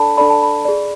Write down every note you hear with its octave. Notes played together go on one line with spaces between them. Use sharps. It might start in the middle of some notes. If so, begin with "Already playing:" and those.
Already playing: D4 A4 D5 A5 B5
D4 A4 D5 B5
A5
B5
G#4 D5